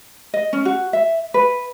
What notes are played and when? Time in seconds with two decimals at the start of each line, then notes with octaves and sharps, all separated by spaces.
0.34 D#5
0.53 C#4
0.65 F#4
0.93 E5
1.34 B4